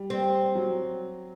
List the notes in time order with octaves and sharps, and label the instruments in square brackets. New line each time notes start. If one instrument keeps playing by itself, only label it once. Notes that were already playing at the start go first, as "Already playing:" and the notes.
Already playing: [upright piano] G3
[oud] C4
[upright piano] F#3